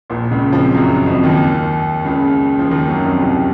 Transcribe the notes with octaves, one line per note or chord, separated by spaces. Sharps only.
A#1 A#2
C#2 C#3
F2 F3
F#2 F#3
F2 F3
D#2 D#3
C#2 C#3
F3
D#2 D#3
F#2 F#3
F2 F3
C2 C3